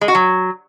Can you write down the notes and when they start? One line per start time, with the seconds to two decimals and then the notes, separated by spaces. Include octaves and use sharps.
0.01 G#3
0.08 F#4
0.15 F#3